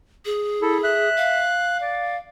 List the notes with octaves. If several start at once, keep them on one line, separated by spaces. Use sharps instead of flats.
G#4
E4 A4
E5 F#6
F5
D5